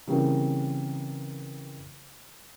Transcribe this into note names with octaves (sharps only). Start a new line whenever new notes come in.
C#3 E3 G3 A#3 C4